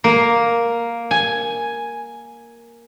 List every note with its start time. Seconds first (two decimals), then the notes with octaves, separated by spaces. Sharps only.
0.04 A#3
1.11 G#5